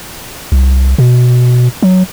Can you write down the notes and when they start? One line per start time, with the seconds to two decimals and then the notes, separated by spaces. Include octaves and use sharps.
0.52 C2
0.98 B2
1.82 F#3